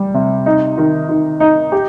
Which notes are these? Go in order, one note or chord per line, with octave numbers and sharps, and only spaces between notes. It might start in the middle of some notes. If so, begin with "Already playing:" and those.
Already playing: G3
C3
D#4
D#3
D#3
D#4
G4